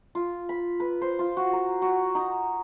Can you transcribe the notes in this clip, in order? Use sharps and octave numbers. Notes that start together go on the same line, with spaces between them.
F4
B5
B4
C5
F4
F#4
A#4
F#4
D#4